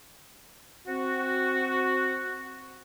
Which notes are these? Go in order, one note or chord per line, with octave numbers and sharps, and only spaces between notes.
C4 F#4